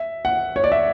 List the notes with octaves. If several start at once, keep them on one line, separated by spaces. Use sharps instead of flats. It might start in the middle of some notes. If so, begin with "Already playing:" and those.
Already playing: E5
F#5
C#5
D5
E5